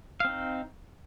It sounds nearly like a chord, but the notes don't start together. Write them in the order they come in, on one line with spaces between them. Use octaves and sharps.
F5 C4 D#4